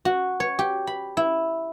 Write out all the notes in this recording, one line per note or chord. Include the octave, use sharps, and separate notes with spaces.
F#4
C#5
G4
B5
E4